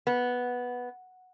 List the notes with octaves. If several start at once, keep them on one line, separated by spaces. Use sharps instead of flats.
B3